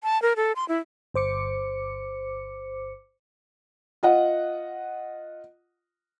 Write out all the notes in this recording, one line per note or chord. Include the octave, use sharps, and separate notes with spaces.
A5
A#4
A4
C6
E4
G1 C5 D6 C#7
F4 D#5 F#5